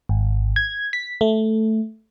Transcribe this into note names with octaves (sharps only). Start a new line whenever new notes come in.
G#1
G#6
B6
A3